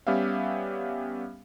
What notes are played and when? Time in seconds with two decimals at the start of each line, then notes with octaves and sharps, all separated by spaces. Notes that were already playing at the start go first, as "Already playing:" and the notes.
0.07 G3 B3 C#4 G4 E5 F5